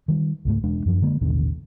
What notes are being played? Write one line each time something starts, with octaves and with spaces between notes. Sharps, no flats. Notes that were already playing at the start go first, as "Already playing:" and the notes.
D#3 G3
C#2 G#2 A3
E1 G#3 D4
F#2 F3 D4
D3 G#3 A#3
A1 D#2 B2 D3